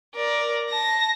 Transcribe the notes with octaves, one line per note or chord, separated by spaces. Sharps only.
A#4 D5
A5 A#6